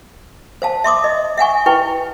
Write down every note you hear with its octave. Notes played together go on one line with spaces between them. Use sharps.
C5 F5 A5
E5 C6 D6 D#6
D#5
E5 F#5 G#5 C#6
E4 B4 G5 C#6